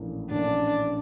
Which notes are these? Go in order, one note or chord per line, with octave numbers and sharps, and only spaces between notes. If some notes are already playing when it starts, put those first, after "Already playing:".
Already playing: A#1 A2 E3 A#3 C#4
A#1 A2 E3 A#3 C#4 D4